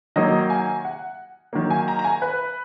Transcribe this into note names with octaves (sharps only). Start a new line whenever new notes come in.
D#3 F#3 A#3 D#5
G#5
F#5
D#3 F#3 A#3
G#5
A#5
A#5
G#5
B4